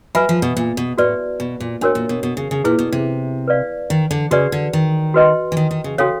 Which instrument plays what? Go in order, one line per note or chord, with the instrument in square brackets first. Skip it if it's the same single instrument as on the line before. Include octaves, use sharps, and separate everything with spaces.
[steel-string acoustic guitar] F#3 [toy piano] B4 E5 G#5 B5
[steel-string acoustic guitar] F3
B2
A#2
B2
[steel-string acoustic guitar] A2 [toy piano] F#4 B4 D5
[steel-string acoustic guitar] B2
A#2
[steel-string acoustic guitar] A2 [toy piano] D4 F#4 A#4 C#5
[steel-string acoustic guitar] A#2
B2
B2
C#3
C#3
[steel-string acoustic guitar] A#2 [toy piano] E4 G#4 B4
[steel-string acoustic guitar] B2
C3
[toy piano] B4 D5 F5
[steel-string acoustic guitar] D#3
D3
[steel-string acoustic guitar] C#3 [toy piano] F#4 B4 D5
[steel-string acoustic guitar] D3
D#3
[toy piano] F#4 B4 D#5 G5 C6
[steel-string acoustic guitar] E3
D#3
D#3
C#3
[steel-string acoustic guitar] C#3 [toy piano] C#4 F#4 A4 C#5 F5